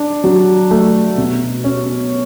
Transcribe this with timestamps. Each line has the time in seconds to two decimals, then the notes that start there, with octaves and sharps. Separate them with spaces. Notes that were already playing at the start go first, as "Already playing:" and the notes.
Already playing: D4
0.24 F#3
0.71 A3
1.18 B2
1.64 C#4